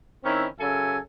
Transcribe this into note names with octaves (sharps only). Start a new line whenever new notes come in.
D#3 C4 C#4 E4
F#2 C#3 A4 E5 G#5